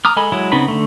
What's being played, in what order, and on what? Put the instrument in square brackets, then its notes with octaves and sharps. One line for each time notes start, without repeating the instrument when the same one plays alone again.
[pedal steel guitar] A#5 D6 D#6 F6
G#3 A4 D#5 G#5 B5
F#3 G#3 E4
C#3 B3 C4 D#4 B5
D3 A3